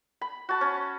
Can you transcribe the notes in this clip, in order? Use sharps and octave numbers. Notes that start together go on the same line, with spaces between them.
B5
F#4 A5
C#4